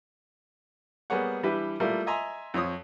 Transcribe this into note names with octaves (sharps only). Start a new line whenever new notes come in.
G3 A#3 B3 G#4 C#5 F#5
E3 G3 D4 E4 G4 B4
G3 A3 A#3 E4 F4
D#5 E5 G#5 A#5 C6
F2 F3 C#5 D#6